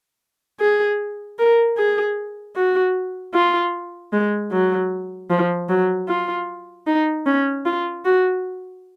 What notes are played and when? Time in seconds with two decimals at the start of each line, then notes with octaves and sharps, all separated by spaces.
0.60 G#4
1.39 A#4
1.78 G#4
2.56 F#4
3.34 F4
4.13 G#3
4.52 F#3
5.30 F3
5.69 F#3
6.09 F4
6.87 D#4
7.26 C#4
7.65 F4
8.05 F#4